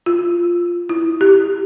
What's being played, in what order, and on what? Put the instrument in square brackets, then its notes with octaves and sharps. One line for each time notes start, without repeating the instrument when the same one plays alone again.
[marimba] F4
E4
G4